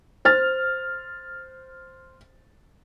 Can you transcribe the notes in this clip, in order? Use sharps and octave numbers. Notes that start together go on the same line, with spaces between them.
C5 F6 A6